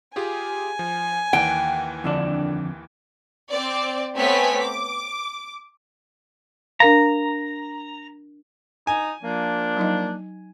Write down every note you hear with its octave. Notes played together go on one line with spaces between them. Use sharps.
F4 G4 G#4 G#5
F3
D#2 E3 F#5 G5
F2 D3 D4
C4 D5
A3 B3 C4 C#5 G#5 B6
D6
D4 A#4 F5 A#5
D#4 G#5
F3 A#3 D4
F#3 D#4 D#5